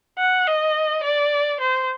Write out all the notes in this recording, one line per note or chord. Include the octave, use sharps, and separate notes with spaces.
F#5
D#5
D5
C5